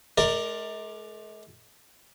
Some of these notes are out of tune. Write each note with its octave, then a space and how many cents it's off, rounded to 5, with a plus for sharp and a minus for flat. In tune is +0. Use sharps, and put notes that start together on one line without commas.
G#3 +45 A#4 +0 D5 +15